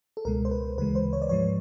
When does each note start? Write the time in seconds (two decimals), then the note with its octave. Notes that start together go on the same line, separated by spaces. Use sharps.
0.17 A4
0.25 C#2 B2 G#3 A#4
0.45 C5
0.51 B4
0.77 D2 C#3 E3 G#3 B4
0.95 C5
1.13 C#5
1.22 D5
1.29 G#2 F3 G#3 C#5